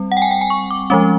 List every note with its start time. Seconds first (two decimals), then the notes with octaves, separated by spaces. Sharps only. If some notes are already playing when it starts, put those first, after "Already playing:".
Already playing: G3 C4
0.12 F#5
0.17 G5
0.22 G#5
0.31 G5
0.41 G#5
0.50 C#6
0.71 D6
0.90 F3 G#3 C#4 D6